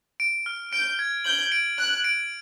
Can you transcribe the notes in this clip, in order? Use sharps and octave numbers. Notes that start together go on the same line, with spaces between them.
D7
F6
G6 D7
G#6
G6 F#7
D7
F#6 F#7
D7